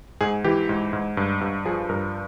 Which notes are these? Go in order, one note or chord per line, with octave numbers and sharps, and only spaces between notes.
G#2 G#4
E3 G4
G#2
G#2
G2
G2
F3 G#4
G2 A#4